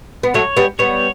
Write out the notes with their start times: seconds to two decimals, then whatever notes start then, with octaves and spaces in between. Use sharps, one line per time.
0.23 B3
0.34 F#3 A3 C#5
0.56 G3 B3
0.79 G3 B3 C#5